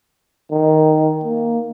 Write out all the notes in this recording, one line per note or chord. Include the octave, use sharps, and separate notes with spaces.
D#3
A#3